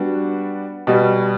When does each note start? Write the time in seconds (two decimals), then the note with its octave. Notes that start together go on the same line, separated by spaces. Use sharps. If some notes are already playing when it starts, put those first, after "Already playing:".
Already playing: G3 B3 D4 F#4
0.87 B2 G3 B3